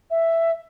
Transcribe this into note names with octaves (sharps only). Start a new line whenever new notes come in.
E5